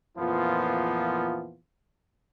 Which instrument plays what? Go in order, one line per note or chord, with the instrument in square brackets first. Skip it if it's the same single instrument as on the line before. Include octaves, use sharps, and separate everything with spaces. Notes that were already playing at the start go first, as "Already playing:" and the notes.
[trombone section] F2 A#2 E3 F3 B3 F4